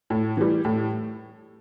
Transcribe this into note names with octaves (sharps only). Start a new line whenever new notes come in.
A2
E3 G3
A2